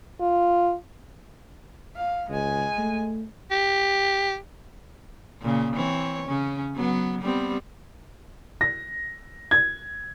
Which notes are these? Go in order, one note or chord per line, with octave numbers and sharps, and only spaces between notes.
F4
F5
C#2 G#3 G#5
A3
G4
A#2 C#3
E3 C4 C#5
C#3 C#4
F#3 B3
G3 B3 C4
A#6
G#6